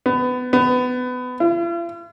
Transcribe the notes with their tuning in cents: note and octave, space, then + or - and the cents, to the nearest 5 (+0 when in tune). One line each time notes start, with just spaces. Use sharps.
B3 +25
B3 +25
F4 -45